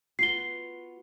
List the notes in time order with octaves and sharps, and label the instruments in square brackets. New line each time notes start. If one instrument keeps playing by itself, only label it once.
[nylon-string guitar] B3 F4 F#4 [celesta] C7 G7